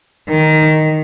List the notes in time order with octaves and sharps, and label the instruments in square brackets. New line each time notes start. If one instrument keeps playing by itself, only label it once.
[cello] D#3